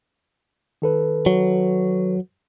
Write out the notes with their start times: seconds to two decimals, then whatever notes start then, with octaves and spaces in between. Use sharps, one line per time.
0.82 D#3 A4 B4
1.26 F#3